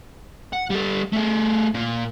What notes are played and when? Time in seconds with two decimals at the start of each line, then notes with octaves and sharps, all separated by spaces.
0.53 F#5
0.70 G3 A4
1.13 A3 G#4
1.74 A#2 A#3